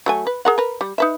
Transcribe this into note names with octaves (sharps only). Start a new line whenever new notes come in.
F#3 A3 G#5
B4
G#4 A#4 F#5
A#4 B4
G3
D#4 B4 E5